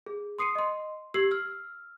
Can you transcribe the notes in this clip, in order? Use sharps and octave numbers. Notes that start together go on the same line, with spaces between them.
G#4
C6 D#6 C7 C#7 D#7
D#5 C6
G4 E6 G#6 C7 F#7
E6 F6